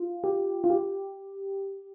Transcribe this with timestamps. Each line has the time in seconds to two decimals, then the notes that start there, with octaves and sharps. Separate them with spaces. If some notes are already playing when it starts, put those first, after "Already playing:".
Already playing: F4
0.24 G4
0.64 F4
0.70 G4